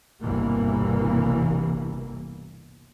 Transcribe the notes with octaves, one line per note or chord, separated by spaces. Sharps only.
G1 C2 G2 B2 E3 A#3